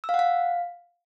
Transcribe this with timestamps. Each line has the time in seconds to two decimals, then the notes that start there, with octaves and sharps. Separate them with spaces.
0.04 E6
0.09 F5
0.14 F#5
0.19 F5